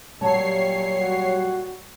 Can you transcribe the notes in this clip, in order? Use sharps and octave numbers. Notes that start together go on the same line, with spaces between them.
A#2 F#3 G3 C#5 A5 C7
F#4